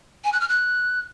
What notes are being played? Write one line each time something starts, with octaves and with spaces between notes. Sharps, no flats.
G#5
F#6
F6
F#6